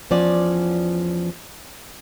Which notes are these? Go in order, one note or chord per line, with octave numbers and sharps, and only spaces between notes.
E2 F3 C#4 D5 F#5